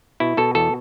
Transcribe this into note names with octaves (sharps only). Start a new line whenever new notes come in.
B2 E4
B2 A4
E2 A4